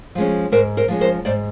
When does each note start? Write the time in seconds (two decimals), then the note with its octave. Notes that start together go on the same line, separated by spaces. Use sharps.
0.15 F3 G#3 C#4
0.52 G#2 A#4 C5
0.77 A#4 C5
0.88 F3 G#3 C#4
1.01 A#4 C5
1.25 G#2 C5 D5